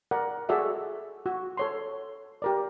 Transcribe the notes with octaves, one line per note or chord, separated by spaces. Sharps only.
A#4 D5 F#5
F#4 G#4 A4 D5 E5
F#4
A4 C#5 C6
G4 A#4 D5